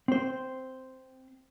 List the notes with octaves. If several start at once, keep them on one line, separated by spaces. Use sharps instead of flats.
C4 C5